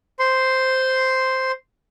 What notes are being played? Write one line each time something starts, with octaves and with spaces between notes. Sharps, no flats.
C5 C6